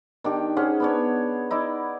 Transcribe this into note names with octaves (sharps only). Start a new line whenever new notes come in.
D#3 D4 G4
C#4 G#4 C5 F#5
B3 D4 C#5
D#4 E4 D5